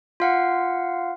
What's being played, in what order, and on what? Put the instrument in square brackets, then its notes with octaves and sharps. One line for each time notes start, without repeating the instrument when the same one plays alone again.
[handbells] F4 F5 F#5